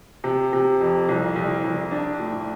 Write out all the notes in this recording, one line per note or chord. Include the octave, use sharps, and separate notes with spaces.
C3
C3
F2
C2
C2
C2
D4
A2